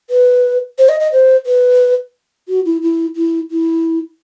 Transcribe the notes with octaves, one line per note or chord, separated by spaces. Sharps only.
B4
C5
D#5
D#5
C5
B4
F#4
E4
E4
E4
E4